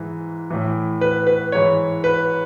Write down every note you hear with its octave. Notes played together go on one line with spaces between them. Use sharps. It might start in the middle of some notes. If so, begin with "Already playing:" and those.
Already playing: G#2 E3
A2 E3
B4
B4
G#2 E3 C#5
B4